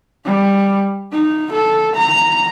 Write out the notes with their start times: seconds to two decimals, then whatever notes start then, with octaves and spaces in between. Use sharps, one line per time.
0.25 G3
1.12 D#4
1.52 A4
1.95 A#5